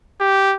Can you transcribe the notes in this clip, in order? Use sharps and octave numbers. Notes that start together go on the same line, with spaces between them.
G4